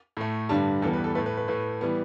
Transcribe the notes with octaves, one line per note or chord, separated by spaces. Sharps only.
A2 A3
G2 D3 G3 A5
E2 E3 G3 B3 A4
B4
A4
A2 A3 B4
B4
B4
A2 A3 B4
E3 G3 B3